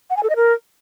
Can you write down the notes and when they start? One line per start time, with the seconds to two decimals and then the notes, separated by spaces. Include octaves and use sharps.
0.10 F#5
0.16 G#5
0.23 A4
0.29 D#5
0.36 A#4